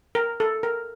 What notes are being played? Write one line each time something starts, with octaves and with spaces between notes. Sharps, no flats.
A#4
A4
A#4